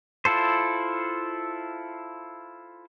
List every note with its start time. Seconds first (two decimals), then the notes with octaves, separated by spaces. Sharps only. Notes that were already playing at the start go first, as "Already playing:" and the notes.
0.25 E4 F4 A4 C5